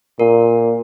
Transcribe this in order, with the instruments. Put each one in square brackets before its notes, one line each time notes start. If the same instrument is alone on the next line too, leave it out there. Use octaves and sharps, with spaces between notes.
[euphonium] A#2 [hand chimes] A#4